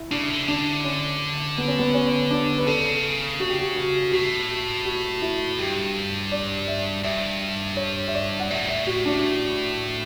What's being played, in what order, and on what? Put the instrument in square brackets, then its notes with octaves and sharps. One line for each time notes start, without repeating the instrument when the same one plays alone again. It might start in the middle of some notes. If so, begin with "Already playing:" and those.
Already playing: [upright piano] E4
[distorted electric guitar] C#3 [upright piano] D4
[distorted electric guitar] D3
C#3
[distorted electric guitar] D3 [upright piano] D4
[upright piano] C#4
B3
C#4
B3
C#4
D4
B4
[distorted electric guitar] C#3 [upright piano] A4
[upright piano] F#4
G4
F#4
F#4
[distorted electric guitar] A2 [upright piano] F#4
[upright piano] F#4
E4
[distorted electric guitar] G2 [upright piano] G4
[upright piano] D5
E5
[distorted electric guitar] G2 [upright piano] E5
[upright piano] C#5
E5
D5
F#5
[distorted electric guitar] A2 [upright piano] E5
[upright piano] E5
F#4
D4